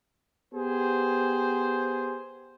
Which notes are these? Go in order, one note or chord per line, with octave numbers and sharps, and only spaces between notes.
B3 G4 G#4 C5